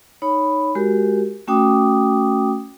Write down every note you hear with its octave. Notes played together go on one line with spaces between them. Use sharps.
D#4 C#5 B5
G#3 F#4 G4 A#4
A3 C#4 F#4 G5 D6 D#6